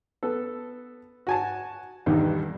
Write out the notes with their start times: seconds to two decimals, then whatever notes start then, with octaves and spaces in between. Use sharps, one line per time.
0.23 B3 A4
1.27 F#4 G#5 A5
2.06 B1 E2 G2 D#3 G3